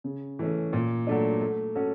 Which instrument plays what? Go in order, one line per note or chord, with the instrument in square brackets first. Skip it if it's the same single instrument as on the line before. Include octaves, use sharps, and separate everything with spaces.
[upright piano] C#3
E3 A3 C#4
A#2
F#3 A3 D4
A3
C#4 F#4 A4